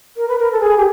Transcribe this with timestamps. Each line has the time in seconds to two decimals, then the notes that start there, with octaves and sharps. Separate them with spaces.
0.17 A#4
0.28 B4
0.39 A#4
0.52 A4
0.61 G#4
0.77 G4